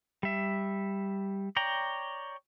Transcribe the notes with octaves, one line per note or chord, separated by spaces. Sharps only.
G3 E5
C#5 D5 G5 A#5